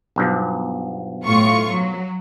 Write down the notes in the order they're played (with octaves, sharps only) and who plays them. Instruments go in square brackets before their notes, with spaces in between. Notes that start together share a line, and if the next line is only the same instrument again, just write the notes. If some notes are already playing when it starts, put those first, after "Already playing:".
[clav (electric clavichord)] B1 G2 F3
[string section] A2 F4 C#6
F#3